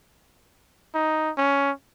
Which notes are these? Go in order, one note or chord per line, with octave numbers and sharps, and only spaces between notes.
D#4
C#4